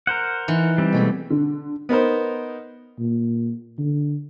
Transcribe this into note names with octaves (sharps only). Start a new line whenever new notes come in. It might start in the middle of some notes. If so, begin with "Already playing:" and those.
A#4 C5 F#5
E3 D#4
G3 C4
B2 G#3 A3
D3
B3 D#4 A#4 C5
A#2
D3